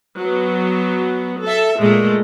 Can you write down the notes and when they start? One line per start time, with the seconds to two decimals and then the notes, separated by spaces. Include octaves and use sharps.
0.19 F#3 B3
1.45 A4 E5
1.80 A#2 G#3 A3